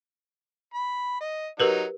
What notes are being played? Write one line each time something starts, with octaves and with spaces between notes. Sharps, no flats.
B5
D#5
F#3 D#4 G4 A#4 B4